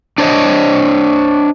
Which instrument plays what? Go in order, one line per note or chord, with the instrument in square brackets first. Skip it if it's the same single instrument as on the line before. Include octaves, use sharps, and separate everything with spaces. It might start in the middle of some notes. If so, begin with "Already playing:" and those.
[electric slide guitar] D4 C5 C#5 D#5